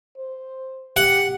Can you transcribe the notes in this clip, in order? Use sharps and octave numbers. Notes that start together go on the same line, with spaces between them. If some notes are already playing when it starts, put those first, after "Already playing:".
C5
G4 F#5